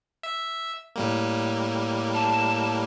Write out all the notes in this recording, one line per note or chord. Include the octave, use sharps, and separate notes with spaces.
E5
A2 G3 A#3
A5